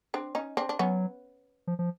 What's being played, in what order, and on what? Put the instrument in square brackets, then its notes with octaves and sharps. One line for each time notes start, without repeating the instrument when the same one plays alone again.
[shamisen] C4 D4
C#4 D#4
C4 D4
D4
[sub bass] F#3 [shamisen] B3 C#4
[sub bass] F3
F3